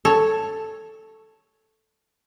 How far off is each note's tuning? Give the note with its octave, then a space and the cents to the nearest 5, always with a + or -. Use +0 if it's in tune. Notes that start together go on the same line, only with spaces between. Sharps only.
A4 +0 C#5 +0